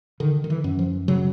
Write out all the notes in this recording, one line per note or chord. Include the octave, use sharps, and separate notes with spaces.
D3 D#3
D#3
E3
F#2
F3
C#3 F#3